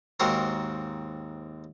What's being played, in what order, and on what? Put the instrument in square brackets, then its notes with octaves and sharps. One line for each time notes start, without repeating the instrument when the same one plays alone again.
[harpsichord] D#2 G#2 C4 F#4 A#4 A#5